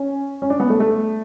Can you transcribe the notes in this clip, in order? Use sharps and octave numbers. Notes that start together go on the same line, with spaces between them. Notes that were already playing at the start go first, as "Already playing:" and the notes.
Already playing: C#4
C#4
D4
B3
A3
A3